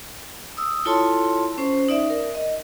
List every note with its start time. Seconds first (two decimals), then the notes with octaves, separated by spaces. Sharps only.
0.57 D#6 E6
0.86 E4 F4 A4 C#5 A5 C6
1.58 C#4 C5
1.89 D#4 D5 E5
2.10 A#4
2.35 D#5